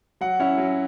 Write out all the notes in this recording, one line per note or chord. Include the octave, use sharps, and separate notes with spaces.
F#3 F#5
C#4 E4
F#3